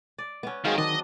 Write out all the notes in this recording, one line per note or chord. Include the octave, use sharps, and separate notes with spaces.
D5
B3 C#4
D#3 F#3 G#3 C4 G#4 F5
D#3 D4 D#5